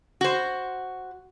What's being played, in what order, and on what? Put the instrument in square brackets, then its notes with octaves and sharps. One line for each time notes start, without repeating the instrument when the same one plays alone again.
[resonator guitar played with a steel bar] F#4 C5